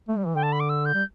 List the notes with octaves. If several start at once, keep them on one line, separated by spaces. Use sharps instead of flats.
A3
G3
E3
D3 G5
A5
B5
D6
E6
G6
G3